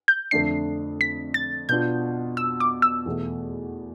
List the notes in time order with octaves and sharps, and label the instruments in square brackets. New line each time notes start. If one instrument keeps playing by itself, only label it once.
[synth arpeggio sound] G6
[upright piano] F2 D3 A3 D4 [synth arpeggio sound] C7
[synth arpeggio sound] B6
A6
[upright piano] B2 B3 D4 F4 [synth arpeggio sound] G6
[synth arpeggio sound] E6
D6
E6
[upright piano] E2 B2 A3